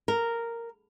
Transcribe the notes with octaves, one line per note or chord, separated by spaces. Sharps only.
A#4